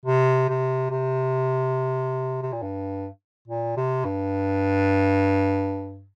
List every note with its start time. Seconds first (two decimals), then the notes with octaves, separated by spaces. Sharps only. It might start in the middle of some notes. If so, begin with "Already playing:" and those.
0.05 C3
0.49 C3
0.91 C3
2.43 C3
2.53 A#2
2.63 G2
3.48 A#2
3.77 C3
4.05 G2